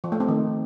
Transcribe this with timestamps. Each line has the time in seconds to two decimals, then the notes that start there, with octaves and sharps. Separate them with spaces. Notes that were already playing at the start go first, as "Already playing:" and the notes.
0.04 F3
0.12 A3
0.20 C4
0.28 D#3